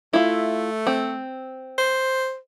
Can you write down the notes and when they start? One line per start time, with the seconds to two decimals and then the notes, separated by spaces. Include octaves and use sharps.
0.13 A3 E4 F4
0.87 C4
1.78 C5